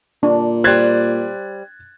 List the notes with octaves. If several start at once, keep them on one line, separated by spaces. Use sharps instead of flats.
A#2 D4
G3 C5 F#6 G#6 A6